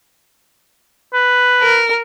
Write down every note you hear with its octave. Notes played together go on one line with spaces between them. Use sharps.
B4
A#4